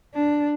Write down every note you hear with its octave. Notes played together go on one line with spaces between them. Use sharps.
D4